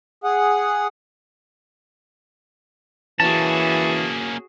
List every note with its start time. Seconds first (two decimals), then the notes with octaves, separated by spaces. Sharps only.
0.24 G#4 F#5
3.20 E3 A#3 C#4 F#4 G#4 A5